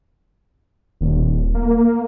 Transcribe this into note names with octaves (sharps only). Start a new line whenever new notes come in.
D#1
A#3